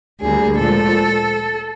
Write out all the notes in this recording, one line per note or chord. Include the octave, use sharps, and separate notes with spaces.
D2 D3 G3 A#3 G#4
A#2 F3 G#3 A4